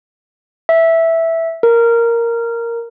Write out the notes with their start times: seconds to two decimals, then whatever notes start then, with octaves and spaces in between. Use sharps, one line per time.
0.69 E5
1.63 A#4